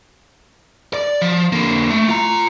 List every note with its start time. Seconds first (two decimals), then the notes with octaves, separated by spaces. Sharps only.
0.93 D5
1.22 F3
1.53 D3 A#3
1.90 A3
2.09 F4 A#5